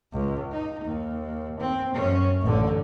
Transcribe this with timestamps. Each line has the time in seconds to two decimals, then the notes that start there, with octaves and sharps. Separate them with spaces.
0.13 C#2
0.51 D#4
0.84 D#2
1.60 C4
1.94 F#2 C#4
2.41 A1 D3